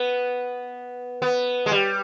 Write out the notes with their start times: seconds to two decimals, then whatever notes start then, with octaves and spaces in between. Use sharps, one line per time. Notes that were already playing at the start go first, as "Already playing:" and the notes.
Already playing: B3
1.22 B3
1.66 G#3
1.71 G3